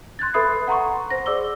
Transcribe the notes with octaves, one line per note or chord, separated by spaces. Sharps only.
C6 F#6 G#6 A6
A4 B4 E5 B5 D#6 C7
F#5 A#5 C6 C#6
C5 A#6
G#4 D5 D6 E6 G7